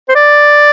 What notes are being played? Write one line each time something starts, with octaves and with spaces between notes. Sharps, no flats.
C5
D5